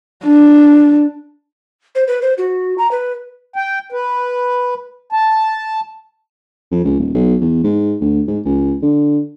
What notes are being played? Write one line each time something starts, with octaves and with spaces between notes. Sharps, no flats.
D4
C5
B4
C5
F#4
A#5
B4
G5
B4
A5
F2
C#2
D#1
B1
E2
G#2
D2
G#2
C#2
D3